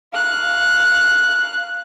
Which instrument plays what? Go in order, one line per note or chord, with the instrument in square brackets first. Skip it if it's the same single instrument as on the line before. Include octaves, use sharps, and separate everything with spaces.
[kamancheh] F5 F#6